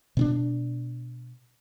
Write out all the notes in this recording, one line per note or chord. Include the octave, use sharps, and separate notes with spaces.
B2 C4 D4